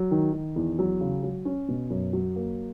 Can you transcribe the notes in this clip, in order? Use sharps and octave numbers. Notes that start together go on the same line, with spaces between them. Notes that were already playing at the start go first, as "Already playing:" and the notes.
Already playing: F#3
D#3
D#3
E2
F#3
C#3
F#3
C#4
B2
F#2
F#3
A#3